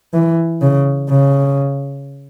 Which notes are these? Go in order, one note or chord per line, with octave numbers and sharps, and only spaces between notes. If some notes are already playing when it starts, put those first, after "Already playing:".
E3
C#3
C#3